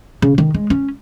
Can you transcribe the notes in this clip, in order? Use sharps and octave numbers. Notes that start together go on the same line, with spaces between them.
C#3
D#3
G#3
C#4